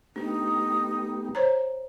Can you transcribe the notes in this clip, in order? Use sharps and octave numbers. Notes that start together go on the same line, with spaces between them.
A3 B3 D4 D#4 G4
C5 C#5 A#5